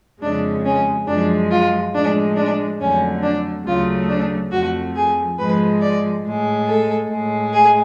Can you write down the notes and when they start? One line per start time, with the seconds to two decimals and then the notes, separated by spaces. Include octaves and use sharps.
0.22 F2 C#3 G#3 D4
0.65 C#4
1.07 F#2 F3 G#3 D4
1.50 F4
1.93 A2 F3 G#3 D4
2.36 D4
2.80 F2 D3 F#3 A3 C#4
3.22 D4
3.66 D2 C#3 F#3 A3 F4
4.08 D4
4.51 F2 F3 A3 F#4
4.95 G#4
5.38 G#2 F3 G#3 B4
5.81 D5
6.24 A2 G#3
6.67 A4
7.10 A2 G#3
7.53 G#4